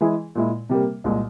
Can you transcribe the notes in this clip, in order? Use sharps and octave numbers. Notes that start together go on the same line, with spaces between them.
E3 G#3 E4 G#4
A#2 G#3 E4
C3 G3 A#3
C2 A#2 G#3